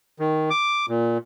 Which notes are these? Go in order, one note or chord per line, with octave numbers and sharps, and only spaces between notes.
D#3
D6
A#2